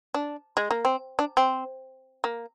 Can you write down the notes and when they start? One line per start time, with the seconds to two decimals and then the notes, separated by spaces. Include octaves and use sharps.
0.14 D4
0.57 G#3
0.71 A#3
0.85 C4
1.19 D4
1.37 C4
2.24 A#3